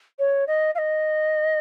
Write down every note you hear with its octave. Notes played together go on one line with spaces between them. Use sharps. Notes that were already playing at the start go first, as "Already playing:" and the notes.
C#5
D#5
F5
D#5